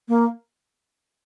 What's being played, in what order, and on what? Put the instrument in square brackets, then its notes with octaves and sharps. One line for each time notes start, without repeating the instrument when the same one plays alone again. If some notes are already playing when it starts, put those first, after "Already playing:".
[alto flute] A#3